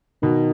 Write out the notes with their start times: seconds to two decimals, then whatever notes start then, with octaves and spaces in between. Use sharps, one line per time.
0.22 B2 D#3